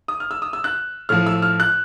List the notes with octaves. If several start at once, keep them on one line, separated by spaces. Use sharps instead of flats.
D#6
F6
E6
D#6
E6
F#6
A2 F3 F6
E6
F6
F#6